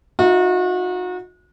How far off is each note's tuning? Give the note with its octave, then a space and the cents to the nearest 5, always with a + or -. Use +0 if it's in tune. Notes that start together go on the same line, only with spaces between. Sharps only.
D#4 +20 F#4 -35 E5 +0